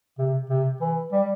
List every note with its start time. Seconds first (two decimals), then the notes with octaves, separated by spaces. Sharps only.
0.18 C3
0.49 C3
0.81 E3
1.12 G3